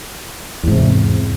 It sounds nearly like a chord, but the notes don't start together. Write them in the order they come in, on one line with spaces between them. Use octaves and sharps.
E2 G#2 C3